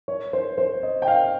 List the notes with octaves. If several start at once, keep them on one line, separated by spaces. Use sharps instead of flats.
C#5
C5
C5
D#5
G5
F5